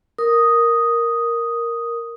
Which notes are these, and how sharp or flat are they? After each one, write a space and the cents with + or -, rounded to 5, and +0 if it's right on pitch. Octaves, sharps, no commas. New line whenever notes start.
A#4 +0 D#6 +0